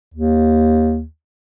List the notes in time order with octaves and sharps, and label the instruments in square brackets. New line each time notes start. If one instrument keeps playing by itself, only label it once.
[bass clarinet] D#2